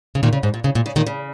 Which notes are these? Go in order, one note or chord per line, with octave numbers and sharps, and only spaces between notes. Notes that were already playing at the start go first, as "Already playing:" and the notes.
C#3
A#2 D#3
C#3
G#2
A#2
C#3
A#2
C#3
A#2 D#3
C#3